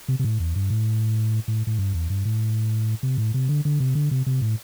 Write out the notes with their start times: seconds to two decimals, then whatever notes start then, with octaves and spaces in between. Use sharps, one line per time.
0.08 C3
0.19 C3
0.24 A2
0.40 E2
0.56 G2
0.70 A2
1.48 A2
1.67 A2
1.79 G2
1.94 E2
2.10 G2
2.25 A2
3.03 C3
3.18 A2
3.34 C3
3.49 D3
3.65 D3
3.80 C3
3.95 D3
4.11 C3
4.26 C3
4.42 A2